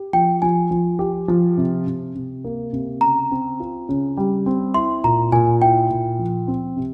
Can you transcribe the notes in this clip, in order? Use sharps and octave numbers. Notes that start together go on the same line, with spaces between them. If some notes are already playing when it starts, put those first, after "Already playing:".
Already playing: G4
F3 G5
F3 G#5
F3
G4
F3
C3
C3
C3
A#3
C3
C#3 A#5
C4
F4
C#3
G3
C4
E4 C6
A#2 A#5
A#2 G#5
E4 G5
A#2
F3
C4
C3